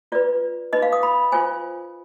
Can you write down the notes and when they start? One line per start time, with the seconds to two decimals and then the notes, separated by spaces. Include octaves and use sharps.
0.12 F4 B4 D5
0.73 D#4 B4 D#5
0.82 F5
0.93 D#6
1.03 B5
1.32 F4 C5 G#5